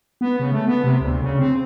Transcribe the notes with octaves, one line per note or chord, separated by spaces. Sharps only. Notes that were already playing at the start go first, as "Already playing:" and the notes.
B3
C#3
A3
B3
C3
D2
C#3
C4